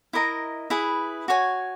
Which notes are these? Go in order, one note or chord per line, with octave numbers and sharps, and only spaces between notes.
E4 A#4 D#5 A#5
E4 G#4 B4
F#4 C#5 G#5